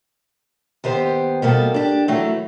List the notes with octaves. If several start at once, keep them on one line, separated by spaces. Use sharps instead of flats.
D#2 B3 G4 C5
B2 G3 A#3 A4
D4 G4
E3 F#3 A3